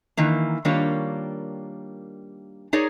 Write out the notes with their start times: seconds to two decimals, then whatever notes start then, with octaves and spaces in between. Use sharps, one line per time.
0.17 D#3 E3 A#3
0.65 D#3 G3 A#3 D4 F4 C#5
2.73 D#4 G#4 A#4 C#5 D5